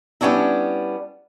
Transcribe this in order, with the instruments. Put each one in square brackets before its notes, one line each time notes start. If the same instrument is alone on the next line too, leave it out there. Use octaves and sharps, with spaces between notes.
[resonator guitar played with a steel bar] G3 B3 C#4 D4 E4